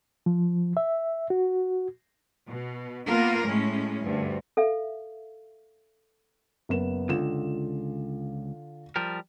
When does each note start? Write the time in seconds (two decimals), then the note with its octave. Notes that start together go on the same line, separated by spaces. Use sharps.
0.26 F3
0.77 E5
1.30 F#4
2.49 B2
3.07 A#3 B3 F4 A#4
3.47 A2 G#3 C#4
4.04 D2 G2
4.57 A4 E5 F5
6.69 F#1 B3 E7
7.09 C#2 D3 F4 E7
8.96 F3 G3 A#4